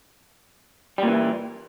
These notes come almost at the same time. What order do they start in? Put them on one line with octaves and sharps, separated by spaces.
G3 A#2 E3